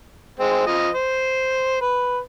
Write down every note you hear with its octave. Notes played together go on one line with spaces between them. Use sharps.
G#3 C4
F3 D#5
C5
B4